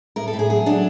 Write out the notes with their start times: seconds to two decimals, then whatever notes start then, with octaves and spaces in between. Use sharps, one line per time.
0.16 A2 A#4
0.28 A4
0.33 A2
0.39 G#4
0.50 F#3 G#4
0.66 F#3 D4